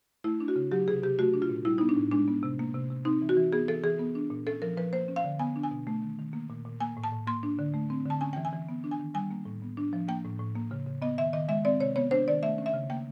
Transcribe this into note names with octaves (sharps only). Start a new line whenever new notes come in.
A3 E4
D4
F#4
C#3
F#3 G4
C3 G#4
C3 G4
A3 F#4
D4
F4
A#2
G3 E4
B3 D#4
D4
A2
G#3 D4
B3
C3
A#3
C3
C3
C4 D#4
E3
F#4
E3
B3 G#4
E3 A4
E3 G#4
B3
D4
A#2
C#4 A4
F3 A#4
F3 B4
A#3 C5
C#4
F5
D3
B3 G#5
D4
G#5
B2
A3
D#3
D#3
A#3
A#2
A#2
A#3 G#5
A2
A5
A2
A#3 C6
D4
D3
A3
C4
D3 A5
C#4 G#5
G5
E3
G#5
E3
B3
D4
G#5
D#3
G3 G#5
A#3
A2
B3
D4
F3
A#3 G5
A2
A2
A#3
C#3
C#3
B3 D#5
D#3 E5
D#3 D#5
G#3 E5
C4 D5
C3 C#5
B3 C#5
D4 C5
D#3 D5
A3 E5
C#4
E5
C#3
A#3 G5